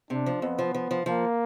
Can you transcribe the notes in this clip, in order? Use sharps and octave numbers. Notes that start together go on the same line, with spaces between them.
C3 D4
F3
F2 B3
F3
F3
F3
F3 A#3